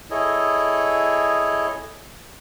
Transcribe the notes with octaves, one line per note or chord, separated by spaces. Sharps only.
E4 G#4 A4 C#5 D#5